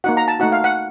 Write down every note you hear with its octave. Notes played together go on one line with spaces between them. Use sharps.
A#3 D#4 F#4 F#5
A#5
A5
A3 D#4 F#4 F#5
F5
F#5